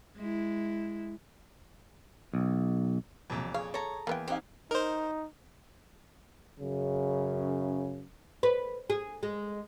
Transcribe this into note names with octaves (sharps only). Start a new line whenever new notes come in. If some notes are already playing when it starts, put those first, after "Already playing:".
G#3 E4
B1
E1 C2 F2 A#2
G#4 C#5 F5
A4 C#5 A#5
E2 A#3 B3 G5
C4 D#4 G4 F5 F#5 G#5
D#4 A#4 C5
F#2 C#3
B4
G#4
G#3